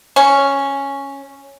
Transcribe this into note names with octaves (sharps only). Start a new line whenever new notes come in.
C#4